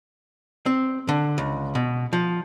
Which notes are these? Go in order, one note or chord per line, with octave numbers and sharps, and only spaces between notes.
C4
D3
C#2
B2
F3